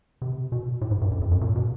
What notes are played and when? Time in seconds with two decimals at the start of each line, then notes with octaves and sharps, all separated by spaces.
0.22 C3
0.52 B2
0.81 A2
0.91 G#2
1.01 G2
1.11 F#2
1.21 F2
1.31 F#2
1.41 A#2
1.56 B2